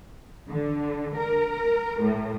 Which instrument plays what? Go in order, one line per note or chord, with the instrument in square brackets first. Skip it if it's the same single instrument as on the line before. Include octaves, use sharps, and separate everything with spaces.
[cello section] D3
A#4
A2